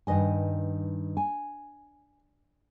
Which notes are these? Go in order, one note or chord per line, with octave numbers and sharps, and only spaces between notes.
G2 D#3 B4 D#5 G#5
G#5